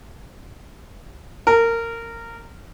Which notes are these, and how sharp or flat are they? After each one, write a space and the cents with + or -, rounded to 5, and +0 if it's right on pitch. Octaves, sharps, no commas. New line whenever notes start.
A#4 -20